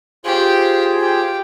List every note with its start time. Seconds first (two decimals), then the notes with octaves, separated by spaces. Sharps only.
0.25 F4 G4 G#4 C5
1.00 G4